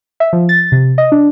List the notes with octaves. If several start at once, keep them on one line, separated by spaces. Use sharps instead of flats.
E5
F3
A6
C3
D#5
D4